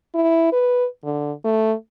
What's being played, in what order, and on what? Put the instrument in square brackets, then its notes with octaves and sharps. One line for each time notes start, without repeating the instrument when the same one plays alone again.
[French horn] E4
B4
D3
A3